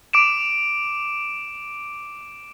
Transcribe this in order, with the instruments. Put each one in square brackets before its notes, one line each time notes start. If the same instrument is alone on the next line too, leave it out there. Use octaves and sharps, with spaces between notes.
[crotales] D6 D7 E7